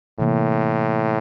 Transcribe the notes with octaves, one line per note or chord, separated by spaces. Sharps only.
A2 C3 E3 A#3